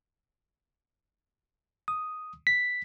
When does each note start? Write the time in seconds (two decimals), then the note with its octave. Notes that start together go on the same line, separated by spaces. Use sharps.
1.88 D#6
2.47 B6